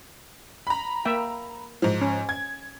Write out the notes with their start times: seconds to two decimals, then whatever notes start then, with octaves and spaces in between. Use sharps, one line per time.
0.67 A#5 B5
1.05 A#3 E5 G5
1.82 G#2 F3
2.01 C#4
2.29 G#6